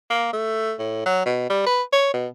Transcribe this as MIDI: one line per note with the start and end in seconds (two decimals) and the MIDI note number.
0.10 0.29 58
0.33 0.74 57
0.79 1.05 45
1.06 1.24 54
1.26 1.46 47
1.50 1.66 55
1.66 1.82 71
1.93 2.12 73
2.13 2.27 47